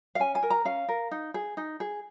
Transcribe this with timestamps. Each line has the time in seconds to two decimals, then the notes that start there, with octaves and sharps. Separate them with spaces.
0.15 F5
0.20 C#4 G#5
0.35 G#5
0.43 A#4
0.50 A#5
0.65 C#4 F5
0.89 A#4
1.11 D#4
1.34 G#4
1.57 D#4
1.80 G#4